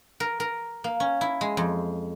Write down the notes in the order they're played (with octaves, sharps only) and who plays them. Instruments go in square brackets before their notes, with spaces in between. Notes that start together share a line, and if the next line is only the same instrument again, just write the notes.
[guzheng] A#4
A#4
A#3
C#4
E4
G#3
F2